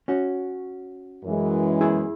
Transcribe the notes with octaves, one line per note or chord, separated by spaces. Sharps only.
C#4 F#4
F#2 E3 G#3
E4 G#4